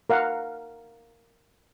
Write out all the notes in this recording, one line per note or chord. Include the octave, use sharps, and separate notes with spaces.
A#4 F5 F#5